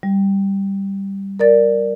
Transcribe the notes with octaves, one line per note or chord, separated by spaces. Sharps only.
G3
A#4 D5 A6